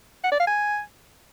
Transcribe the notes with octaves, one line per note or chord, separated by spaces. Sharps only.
F#5
D5
F5
G#5